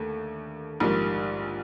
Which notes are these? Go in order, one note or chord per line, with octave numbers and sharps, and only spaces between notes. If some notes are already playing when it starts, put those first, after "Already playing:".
Already playing: D#2 D3 A3
A#1 G#2 D#3 G3